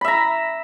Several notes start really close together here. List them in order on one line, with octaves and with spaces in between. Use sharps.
B5 E5 A#5